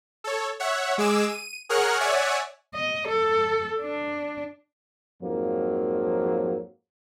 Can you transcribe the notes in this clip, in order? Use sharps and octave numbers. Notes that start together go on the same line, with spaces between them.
A4 C#5
C#5 E5 F#5
G#3 G#4 D6 E6 E7
D#7
G#4 A#4 C#5 F#5 F6 F#6
C#5 D5 E5 F#5 G#5
D#5
A4
D4
F2 G#2 F3 F#3 A#3